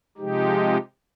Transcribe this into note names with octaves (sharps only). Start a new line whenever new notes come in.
C3 F3 G#3 D#4 G4